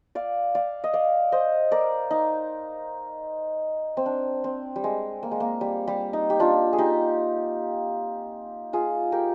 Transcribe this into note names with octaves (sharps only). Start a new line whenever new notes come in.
D5 F5
D5 F5
D#5
D5 F5
C5 D#5
A#4 D5
D#4
C4
D4
C4
G3
G#3
A#3
G#3
A#3
G3
G3
D#4
G4
D4 F4
G#4
D#4 G4
F4 G#4
G4 A#4